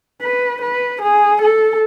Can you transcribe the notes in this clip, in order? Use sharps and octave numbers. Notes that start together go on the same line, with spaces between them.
B4
B4
G#4
A4